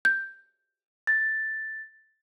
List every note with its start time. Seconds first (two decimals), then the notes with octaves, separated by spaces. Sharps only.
0.05 G6
1.07 A6